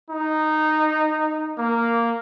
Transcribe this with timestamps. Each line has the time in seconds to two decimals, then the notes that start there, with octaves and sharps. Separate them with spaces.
0.10 D#4
1.58 A#3